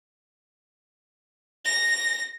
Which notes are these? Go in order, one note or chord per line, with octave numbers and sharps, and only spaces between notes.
A#6